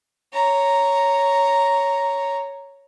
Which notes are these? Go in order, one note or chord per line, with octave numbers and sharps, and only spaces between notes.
C#5 A#5